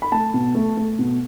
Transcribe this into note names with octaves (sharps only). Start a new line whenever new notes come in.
B5
A3 A5
B2
A3
A3
B2